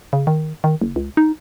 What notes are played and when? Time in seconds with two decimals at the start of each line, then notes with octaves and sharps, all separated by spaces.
0.13 C#3
0.27 D#3
0.64 D#3
0.82 F#1
0.96 C#2
1.17 D#4